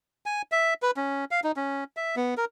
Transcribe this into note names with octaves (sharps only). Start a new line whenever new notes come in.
G#5
E5
B4
C#4
F5
D#4
C#4
E5
B3
A#4